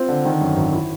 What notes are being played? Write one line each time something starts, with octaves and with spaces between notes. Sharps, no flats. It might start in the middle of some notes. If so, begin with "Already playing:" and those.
Already playing: C4 F4
D3
D#3
F#2
G#1
E4